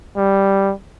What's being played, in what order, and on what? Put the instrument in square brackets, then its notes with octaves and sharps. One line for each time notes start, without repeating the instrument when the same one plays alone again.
[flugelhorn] G3